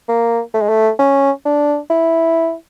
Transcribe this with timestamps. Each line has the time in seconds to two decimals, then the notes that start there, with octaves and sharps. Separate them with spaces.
0.08 A#3
0.54 A3
0.61 G#3
0.69 A3
0.99 C#4
1.45 D4
1.90 E4